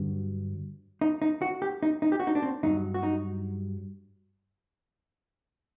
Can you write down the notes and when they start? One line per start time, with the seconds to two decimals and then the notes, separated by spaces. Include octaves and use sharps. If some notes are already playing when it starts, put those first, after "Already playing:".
Already playing: G2 D3 F#3
1.01 D#4
1.22 D#4
1.42 F#4
1.62 G4
1.83 D#4
2.02 D#4
2.12 G4
2.20 F#4
2.27 D#4
2.35 D4
2.42 C4
2.63 G2 F#3 D#4
2.94 F#4
3.03 D#4